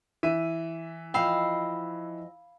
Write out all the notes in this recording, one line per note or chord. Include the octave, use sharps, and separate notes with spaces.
E3 E5 D#7
F3 D#5 F5 G5 B5 E6